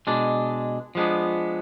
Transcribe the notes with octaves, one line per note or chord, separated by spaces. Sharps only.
B2 G#3 D4
F3 G#3 B3 D4